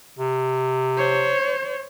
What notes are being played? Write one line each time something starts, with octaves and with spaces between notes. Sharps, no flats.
C3
C5 C#5